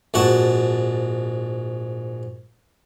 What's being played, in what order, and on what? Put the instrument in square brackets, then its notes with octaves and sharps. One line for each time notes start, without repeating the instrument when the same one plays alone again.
[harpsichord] A#1 G#2 F#4 A5